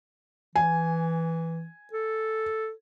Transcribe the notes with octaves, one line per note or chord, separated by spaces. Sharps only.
E3 G#5
A4